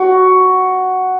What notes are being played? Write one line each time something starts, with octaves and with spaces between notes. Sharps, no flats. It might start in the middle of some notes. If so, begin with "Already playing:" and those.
Already playing: F#4